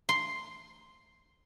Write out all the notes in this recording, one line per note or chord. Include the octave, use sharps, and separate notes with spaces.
C6